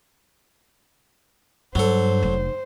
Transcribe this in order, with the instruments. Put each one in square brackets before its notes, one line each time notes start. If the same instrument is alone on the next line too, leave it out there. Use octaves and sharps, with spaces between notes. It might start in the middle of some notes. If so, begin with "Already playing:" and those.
[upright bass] G2 [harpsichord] F#3 A4 [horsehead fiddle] C5
[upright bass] F1